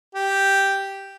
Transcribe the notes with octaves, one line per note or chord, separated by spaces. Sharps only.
G4